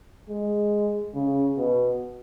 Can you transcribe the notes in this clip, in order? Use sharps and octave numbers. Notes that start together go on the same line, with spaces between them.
G#3
C#3
B2